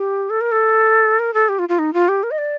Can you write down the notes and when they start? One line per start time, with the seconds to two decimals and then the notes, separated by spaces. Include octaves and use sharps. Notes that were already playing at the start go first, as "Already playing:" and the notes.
Already playing: G4
0.30 A4
0.41 A#4
0.52 A4
1.19 A#4
1.34 A4
1.49 G4
1.59 F4
1.69 F4
1.79 D#4
1.94 F4
2.08 G4
2.23 A#4
2.31 D#5
2.38 D5